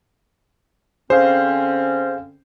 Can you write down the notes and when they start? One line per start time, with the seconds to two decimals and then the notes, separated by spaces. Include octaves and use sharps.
1.10 D3 C4 C#4 G#4 C5 F5